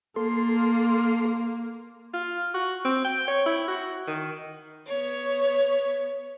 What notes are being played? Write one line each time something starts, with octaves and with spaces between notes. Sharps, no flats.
A#3 A4 C6
F4
F#4
C4
G5
C#5
E4
F#4
D#3
B3 C#5